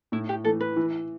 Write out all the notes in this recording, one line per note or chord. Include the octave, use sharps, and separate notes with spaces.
A2 E4
G4
E3 A3 A4
B4
E3